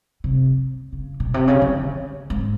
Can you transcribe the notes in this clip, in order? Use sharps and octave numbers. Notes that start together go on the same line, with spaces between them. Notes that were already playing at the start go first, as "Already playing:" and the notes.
C3
C#3
B2
C3
C#3
D3
G#2